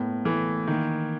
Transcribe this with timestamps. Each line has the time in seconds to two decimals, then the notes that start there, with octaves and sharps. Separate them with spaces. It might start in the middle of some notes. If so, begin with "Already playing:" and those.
Already playing: A2 A#3 B3
0.25 E3 A3
0.67 D#3 A#3